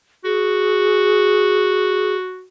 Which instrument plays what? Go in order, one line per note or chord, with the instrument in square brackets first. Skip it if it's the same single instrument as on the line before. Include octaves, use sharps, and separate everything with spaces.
[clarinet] F#4 [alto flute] G#4